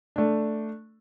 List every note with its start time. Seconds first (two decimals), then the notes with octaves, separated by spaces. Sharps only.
0.16 A3 D4